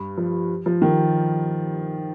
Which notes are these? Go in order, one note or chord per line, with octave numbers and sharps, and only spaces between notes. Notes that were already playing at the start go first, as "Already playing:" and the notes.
Already playing: G2
F3
F3
D#3